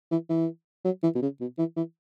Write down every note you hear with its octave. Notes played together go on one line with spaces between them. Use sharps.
E3
E3
F#3
E3
B2
C#3
B2
E3
E3